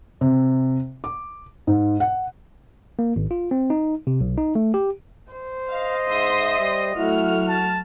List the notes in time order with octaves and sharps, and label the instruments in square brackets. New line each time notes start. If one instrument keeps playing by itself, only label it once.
[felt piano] C3
D6
G#2
F#5
[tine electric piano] A#3
G#1
F4
C4
D#4
C3
B1
D#4
A3
G4
[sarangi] C5
[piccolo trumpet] D#5 [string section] F5
[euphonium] G#2 [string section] E5 C6 D#6
[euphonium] G3
[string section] F#3 A3 F6 [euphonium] E4 [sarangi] F#4
[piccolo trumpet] A5